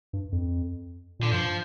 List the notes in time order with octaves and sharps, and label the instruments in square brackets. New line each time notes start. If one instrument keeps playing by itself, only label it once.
[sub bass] G2
F2
[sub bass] A#2 [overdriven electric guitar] D3
[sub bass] G2 [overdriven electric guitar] F3